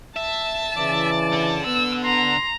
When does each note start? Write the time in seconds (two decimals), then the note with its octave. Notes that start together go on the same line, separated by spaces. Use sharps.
0.17 E5 A5
0.77 C#3 E3 D5
1.32 D3 A4
1.66 B3 E6
2.05 A#5 C6